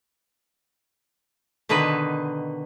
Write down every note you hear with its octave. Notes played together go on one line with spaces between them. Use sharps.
B2 D3 D#3 D#4 B4